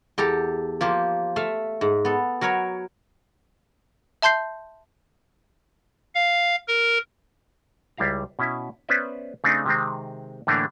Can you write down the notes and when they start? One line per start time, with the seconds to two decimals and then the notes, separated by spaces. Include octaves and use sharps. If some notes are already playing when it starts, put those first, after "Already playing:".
0.18 E2 G4 A4 A#5
0.81 F3 A#3 G4 C5
1.36 A3 E5 F5
1.81 G#2
2.05 B3 A4
2.41 F#3 A#4 B4 C#5
4.22 E5 A5 C6 G6 C7
6.15 F5
6.68 A#4
7.97 C#2 G3 E4 F5 A#5
8.39 B2 C#4 E4 E5
8.89 B3 C#4 B4 C5 D5 E5
9.44 C#3 A3 C4 D4 D#4
9.66 C3 D#3 G#3 C4
10.47 A2 D3 E3 A3 A#3 D4